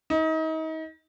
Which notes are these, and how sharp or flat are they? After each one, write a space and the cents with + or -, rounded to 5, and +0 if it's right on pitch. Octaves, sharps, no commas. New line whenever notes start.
D#4 +35